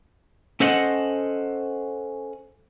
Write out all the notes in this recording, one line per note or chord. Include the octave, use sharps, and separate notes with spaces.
C#4 A4 C5 D#5 F#5